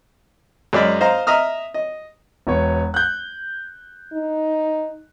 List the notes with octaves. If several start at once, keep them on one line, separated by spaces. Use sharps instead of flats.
F#2 G#3 D5 D#5 B5 F6
C5 D#5 F5 A#5
D#5 E5 A#5 D#6 F6
D#5
E1 B3 C#5
F#6 G6
D#4